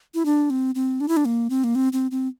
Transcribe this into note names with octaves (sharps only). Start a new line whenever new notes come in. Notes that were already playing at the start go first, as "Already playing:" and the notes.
E4
D4
C4
C4
D4
E4
D4
A#3
C4
A#3
C4
C4
C4